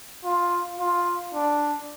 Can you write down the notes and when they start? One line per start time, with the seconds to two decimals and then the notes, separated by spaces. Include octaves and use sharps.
0.25 F4
0.80 F4
1.34 D4